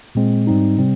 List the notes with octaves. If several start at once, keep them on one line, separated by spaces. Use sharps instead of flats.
A#2 G#3 C4
G#2 G3 C4 D#4
C3 G3 C4